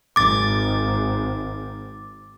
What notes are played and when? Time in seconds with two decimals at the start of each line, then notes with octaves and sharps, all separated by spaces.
0.16 G#1 D6 A6